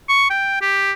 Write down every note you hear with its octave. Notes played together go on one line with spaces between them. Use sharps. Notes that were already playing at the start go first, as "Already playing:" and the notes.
C#6
G5
G4